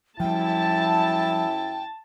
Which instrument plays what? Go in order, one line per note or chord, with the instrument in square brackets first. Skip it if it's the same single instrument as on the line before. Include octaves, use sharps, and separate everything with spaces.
[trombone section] F#2 E4 [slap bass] F3 G3 [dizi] G5 [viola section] A5